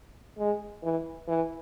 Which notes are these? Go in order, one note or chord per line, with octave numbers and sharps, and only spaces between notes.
G#3
E3
E3